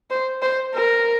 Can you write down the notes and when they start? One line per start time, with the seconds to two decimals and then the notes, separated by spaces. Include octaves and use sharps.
0.11 C5
0.42 C5
0.75 A#4